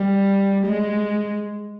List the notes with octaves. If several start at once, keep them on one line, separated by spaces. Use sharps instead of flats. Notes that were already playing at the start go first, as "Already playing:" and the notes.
Already playing: G3
G#3